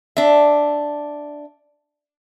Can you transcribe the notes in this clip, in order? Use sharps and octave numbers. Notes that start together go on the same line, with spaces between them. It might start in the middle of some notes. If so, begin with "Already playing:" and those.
D4 E5